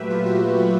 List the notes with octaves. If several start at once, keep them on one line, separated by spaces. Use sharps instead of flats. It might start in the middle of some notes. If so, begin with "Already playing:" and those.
Already playing: A#2 F#3 A3 G4 B4 E5
F4
F#4
F#4